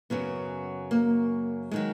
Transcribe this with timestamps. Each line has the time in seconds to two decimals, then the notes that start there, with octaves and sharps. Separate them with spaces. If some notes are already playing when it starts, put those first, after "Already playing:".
0.10 F#2 C#3 F#3 B3
0.91 A#3
1.71 D#3 F#3 G#3